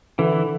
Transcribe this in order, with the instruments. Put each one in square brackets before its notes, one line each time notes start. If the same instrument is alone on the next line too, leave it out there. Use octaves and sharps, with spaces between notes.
[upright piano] D3 [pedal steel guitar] E3